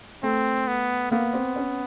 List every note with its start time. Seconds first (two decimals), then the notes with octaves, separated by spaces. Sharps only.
0.23 A3 C4
0.67 B3
1.11 A#3 B3
1.33 C4
1.56 C#4